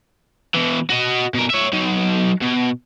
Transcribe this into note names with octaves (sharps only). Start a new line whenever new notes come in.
B2 E3
F#4 D#5
B2 A#4
C#5 E5
F#3 D#4
B2